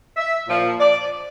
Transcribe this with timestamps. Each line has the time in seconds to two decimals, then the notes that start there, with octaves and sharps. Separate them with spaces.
0.17 E5
0.47 A#2 F3
0.80 D5